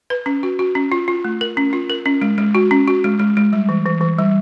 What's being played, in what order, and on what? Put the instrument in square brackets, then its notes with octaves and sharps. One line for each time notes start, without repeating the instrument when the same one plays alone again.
[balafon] B4
C#4
F#4
F#4
C#4
F4
F4
A3
A#4
C#4
F4
A#4
C#4
G#3
G#3
F#4
C#4
F#4
G#3
G#3
G#3
G3
E3
E3
E3
G3